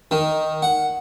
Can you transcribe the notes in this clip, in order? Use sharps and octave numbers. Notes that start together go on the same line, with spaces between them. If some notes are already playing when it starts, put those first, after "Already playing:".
D#3
F#5